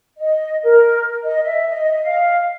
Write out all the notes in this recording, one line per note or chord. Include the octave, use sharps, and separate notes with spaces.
D#5
A#4
D#5
E5
D#5
F5